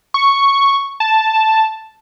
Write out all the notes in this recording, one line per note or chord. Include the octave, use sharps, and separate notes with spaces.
C#6
A5